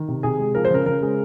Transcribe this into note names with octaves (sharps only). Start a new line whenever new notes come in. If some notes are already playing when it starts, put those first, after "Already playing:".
Already playing: D#3
C3
C3 G#4
G#3
F3 A#4
C5
C#3 A#4
C#3 A#4
G#3